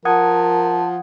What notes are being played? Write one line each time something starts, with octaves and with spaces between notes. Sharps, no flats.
F3 A#4 F#5 A5 D#6 G#6